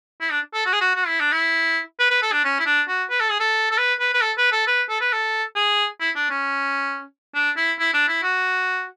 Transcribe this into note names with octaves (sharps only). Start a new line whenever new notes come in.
E4
D4
A4
F#4
G#4
F#4
F#4
E4
D4
E4
B4
B4
A4
D4
C#4
E4
D4
F#4
B4
A4
G#4
A4
A4
B4
B4
B4
A4
B4
A4
B4
A4
B4
A4
G#4
E4
D4
C#4
D4
E4
E4
D4
E4
F#4